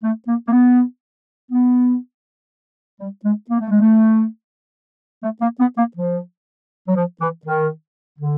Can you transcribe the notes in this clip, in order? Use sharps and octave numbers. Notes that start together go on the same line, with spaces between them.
A3
A#3
A#3
B3
B3
G3
G#3
A#3
A3
G#3
A3
A3
A#3
B3
A#3
F3
F#3
F3
E3
D#3
D3